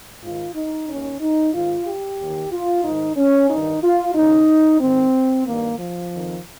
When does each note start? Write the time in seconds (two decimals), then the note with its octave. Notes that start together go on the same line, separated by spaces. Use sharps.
0.22 G#2 D#3 F4
0.55 D#4
0.88 D#2 D#3 C#4
1.21 D#4
1.54 G#2 D#3 F4
1.86 G4
2.20 D#2 D#3
2.53 F4
2.84 G#2 D#3 D#4
3.17 C#4
3.50 G2 D#3 D#4
3.84 F4
4.15 D#2 C#3 D#4
4.81 G#2 D#3 C4
5.46 G2 D#3 A#3
5.79 F3
6.13 F2 D#3